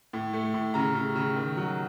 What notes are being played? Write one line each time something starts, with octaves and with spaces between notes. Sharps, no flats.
A2
A3
A2
C#3 A#5
C#3
C#3
D#3
F#3